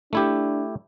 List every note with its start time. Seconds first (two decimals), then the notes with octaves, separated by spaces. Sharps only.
0.13 A3 D4 E4 G4